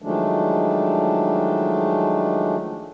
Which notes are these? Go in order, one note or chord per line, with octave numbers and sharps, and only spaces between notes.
D#3 F3 F#3 G#3 A3 D4